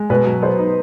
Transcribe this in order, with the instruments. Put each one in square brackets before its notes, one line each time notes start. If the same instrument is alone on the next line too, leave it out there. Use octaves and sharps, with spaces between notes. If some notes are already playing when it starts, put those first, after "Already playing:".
Already playing: [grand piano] G#3
[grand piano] B2 [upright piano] B4
[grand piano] F#3
[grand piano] B3 [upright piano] C5
[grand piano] D#4